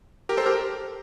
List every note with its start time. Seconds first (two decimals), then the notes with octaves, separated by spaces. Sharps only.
0.29 G4 A#4
0.37 A4 C5
0.46 G4 A#4